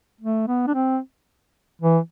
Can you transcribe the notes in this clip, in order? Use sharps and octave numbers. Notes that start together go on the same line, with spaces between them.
A3
B3
D4
C4
E3